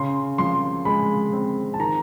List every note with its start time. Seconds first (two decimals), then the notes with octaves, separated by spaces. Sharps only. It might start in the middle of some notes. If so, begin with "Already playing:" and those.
Already playing: C#3 C6
0.38 F3 C6
0.85 G#3 B5
1.33 C4
1.74 A5
1.79 D#3 A#5